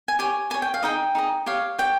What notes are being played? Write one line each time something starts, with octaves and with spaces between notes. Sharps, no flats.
G#5
G4 C#5 G#5
G4 C#5 G#5
G5
F5
D#4 G#4 D#5 G5
D#4 G#4 D#5
G4 C#5 F5
G4 C#5 G5